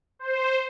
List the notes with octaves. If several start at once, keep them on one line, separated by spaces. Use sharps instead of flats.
C5